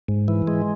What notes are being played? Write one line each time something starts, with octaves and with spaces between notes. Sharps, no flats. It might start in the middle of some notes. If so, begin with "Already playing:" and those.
G#2
E3
G#3